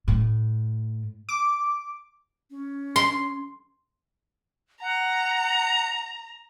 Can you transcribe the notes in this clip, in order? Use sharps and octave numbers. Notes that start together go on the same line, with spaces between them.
A2
D6
C#4
C6
F#5 A#5